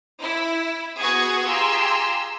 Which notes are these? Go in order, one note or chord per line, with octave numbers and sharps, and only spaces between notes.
E4
B3 F#4 G#4 C#6 D#6 G#6
F4 G4 G#4 A#5 C6 E6